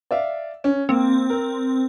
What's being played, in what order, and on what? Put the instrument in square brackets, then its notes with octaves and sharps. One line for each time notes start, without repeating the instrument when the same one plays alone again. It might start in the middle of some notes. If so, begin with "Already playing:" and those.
[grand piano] D5 E5 F5
C#4
[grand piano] A#3 [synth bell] C4
[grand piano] A#4